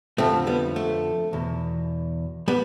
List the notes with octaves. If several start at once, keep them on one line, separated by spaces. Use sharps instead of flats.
F2 D3 F3 A3 C4
G3 B3
A3
E2 B2
G3 B3